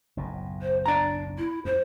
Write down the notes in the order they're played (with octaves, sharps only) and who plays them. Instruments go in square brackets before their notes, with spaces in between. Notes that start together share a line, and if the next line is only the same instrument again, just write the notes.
[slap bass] F#1 B1 A2
[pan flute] C5
[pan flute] D4 [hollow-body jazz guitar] D5 A#5
[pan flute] E4
[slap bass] F2 [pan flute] C5